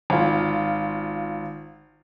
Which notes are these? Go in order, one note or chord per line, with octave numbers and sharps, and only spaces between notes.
G#1 F4